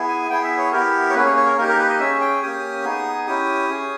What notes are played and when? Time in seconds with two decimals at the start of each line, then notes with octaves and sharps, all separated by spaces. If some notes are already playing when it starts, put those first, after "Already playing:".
Already playing: B3 E4 G#4
0.08 G#5
0.29 B3 E4 G#4 G5
0.43 E5
0.57 C#5
0.72 B3 E4 G4 A#4
1.10 C#5
1.14 A#3 C#4 G#4 B4
1.25 C#5
1.36 C#5
1.46 A#4
1.58 A#3 D#4 G4 A#4
1.68 A#4
1.78 B4
1.89 D#5
1.99 C#4 G#4 E5
2.21 G5
2.42 A#3 C#4 G4 D#6
2.84 B3 D#4 G#4
3.27 C#4 E4 G4 D#6
3.69 C#4 G#4